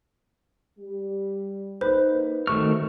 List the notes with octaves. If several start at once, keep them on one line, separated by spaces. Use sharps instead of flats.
G3
A#3 D#4 B4 C5
D#3 A3 C4 F#4 C#6 F6